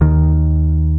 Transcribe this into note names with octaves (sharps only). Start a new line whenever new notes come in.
D#2 D#3